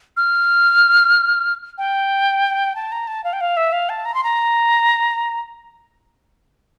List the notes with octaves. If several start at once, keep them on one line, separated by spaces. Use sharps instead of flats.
F6
G5
A5
A#5
A5
F5
G5
F5
E5
F5
A5
A#5
C6
A#5